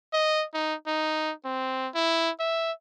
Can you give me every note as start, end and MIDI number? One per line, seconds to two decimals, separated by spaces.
0.13 0.45 75
0.54 0.74 63
0.87 1.32 63
1.45 1.89 60
1.94 2.30 64
2.39 2.72 76